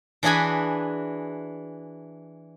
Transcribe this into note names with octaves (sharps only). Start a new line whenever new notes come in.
E3 D4 F#4 G#4 G#5 B5